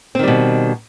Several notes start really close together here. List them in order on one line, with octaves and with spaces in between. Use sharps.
C4 D#3 G3 B2